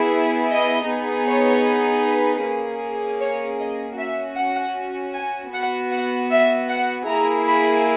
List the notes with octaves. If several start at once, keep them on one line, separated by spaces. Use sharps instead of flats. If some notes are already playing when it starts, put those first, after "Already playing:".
Already playing: B3 E4 G#4
D#5
B3 D#4 G#4
C#5
B4
A#3 C#4 G#4
C#5
D#5
C#4 F#4 E5
F#5
G#5
B3 F#4 F#5
F#5
E5
F#5
A#3 E4 G#4 A#5
B5